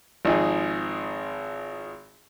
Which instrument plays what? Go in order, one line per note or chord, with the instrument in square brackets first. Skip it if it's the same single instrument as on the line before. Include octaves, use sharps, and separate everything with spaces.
[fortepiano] G#1 F3 D#4 G#4